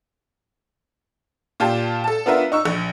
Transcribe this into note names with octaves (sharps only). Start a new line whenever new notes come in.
A#2 F4 G4 A5
A4 A5
B3 D4 F4 A#4 B4 E5
D#4 C#6 E6
A#1